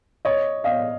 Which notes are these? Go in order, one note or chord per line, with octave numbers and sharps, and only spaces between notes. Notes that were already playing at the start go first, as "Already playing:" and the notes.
C#5 D#5
D#5 F5